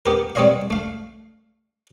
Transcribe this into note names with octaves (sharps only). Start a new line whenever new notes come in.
B3 G4 A#4
G3 B3 C4 C#5 D#5 F5
A3 F5